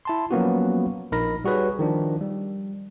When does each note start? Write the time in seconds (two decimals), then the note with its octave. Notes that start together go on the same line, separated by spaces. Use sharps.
0.05 E4 A5 C6
0.31 F3 F#3 A#3 B3 C#4 F#4
1.12 A#1 D#4 A#4 B5 A#6
1.44 G3 F#4 G#4 B4 C#5
1.79 D#3 F3 D4
2.21 G3